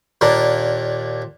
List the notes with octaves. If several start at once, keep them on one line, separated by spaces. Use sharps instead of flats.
D#2 A#2 D4 A#4